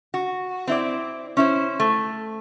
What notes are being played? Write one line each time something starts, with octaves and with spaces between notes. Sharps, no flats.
F#4
C4 E4 D5
C#4 E4 C5
A3